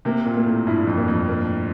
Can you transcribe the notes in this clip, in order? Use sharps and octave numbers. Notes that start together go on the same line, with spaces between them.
C3 A#3
A#2
A#3
A2
G2 E4
F2
A#3
F2
A#3